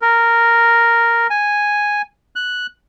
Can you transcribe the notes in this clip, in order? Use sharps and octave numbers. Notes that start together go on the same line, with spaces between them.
A#4
G#5
F#6